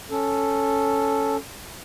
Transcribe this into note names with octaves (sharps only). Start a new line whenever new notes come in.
C#4 A4